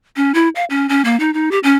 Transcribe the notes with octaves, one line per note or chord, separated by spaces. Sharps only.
C#4
E4
F5
C#4
C#4
A#3
D#4
D#4
G4
C#4